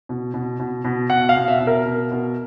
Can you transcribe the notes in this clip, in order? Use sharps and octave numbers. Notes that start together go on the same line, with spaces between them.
B2
B2
B2
B2
B2 F#5
F5
B2
E5
B2
A#4
B2
B2